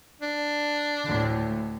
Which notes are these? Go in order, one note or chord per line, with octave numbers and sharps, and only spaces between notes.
D4
D2 A2